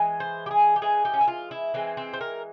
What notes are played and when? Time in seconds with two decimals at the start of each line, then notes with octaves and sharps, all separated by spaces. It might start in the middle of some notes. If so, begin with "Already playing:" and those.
Already playing: E3 G#3
0.20 C5
0.46 G4
0.51 G#4
0.76 G4
0.82 E3 G#3 G#4
1.05 G4
1.14 C#4
1.21 E4
1.27 F4
1.51 E4
1.74 E3 G#3 C4
1.97 C4
2.14 C5
2.21 A#4